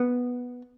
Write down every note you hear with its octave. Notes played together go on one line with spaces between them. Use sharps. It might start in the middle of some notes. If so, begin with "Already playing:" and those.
Already playing: B3